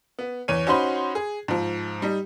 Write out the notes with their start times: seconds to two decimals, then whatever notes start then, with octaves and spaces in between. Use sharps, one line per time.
0.19 B3
0.48 E2 C#5 D#7
0.67 C#4 D#4 F#4 C5 B5 C6
1.15 G#4
1.48 G#2 F3
2.02 G3 D#4